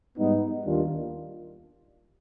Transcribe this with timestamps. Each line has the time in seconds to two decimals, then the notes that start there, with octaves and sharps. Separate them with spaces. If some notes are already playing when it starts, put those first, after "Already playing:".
0.19 G#2 G3 B3 D#4
0.65 D#2 D#3 G3 D4 F4